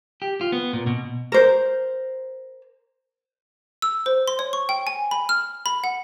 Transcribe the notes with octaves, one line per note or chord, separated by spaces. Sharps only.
G4
F4
B3
A#2
B2
A#4 C5
E6
C5
C6
C#5
C#6
G5
G#5
B5
F6
B5
F#5